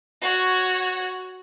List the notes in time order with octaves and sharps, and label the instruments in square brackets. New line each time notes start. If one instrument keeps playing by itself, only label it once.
[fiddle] F#4 C#5